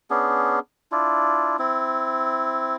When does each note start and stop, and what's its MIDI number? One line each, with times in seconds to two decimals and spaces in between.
0.10 0.59 59
0.10 0.59 61
0.10 0.59 62
0.10 0.59 68
0.92 1.57 62
0.92 1.57 64
0.92 1.57 65
1.59 2.76 60
1.59 2.76 64